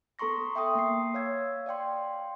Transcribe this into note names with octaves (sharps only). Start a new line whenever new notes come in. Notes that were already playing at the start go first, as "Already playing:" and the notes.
B3 A4 A#5 C6 C#6 A#6
E5 G5 C6 D#6
A#3 C7
C#5 F5 E6 G#6
D5 F5 G5 C6